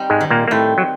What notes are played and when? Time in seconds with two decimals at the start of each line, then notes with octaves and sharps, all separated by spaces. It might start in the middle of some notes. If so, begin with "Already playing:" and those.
Already playing: G3 C4 D#4
0.10 G#2 G#3
0.21 D#3
0.30 A#2 A#3
0.48 A#3
0.51 A2 A3 C4
0.78 F#3